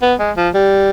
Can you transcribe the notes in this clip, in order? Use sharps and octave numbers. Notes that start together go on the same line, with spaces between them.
B3
G#3
F3
G3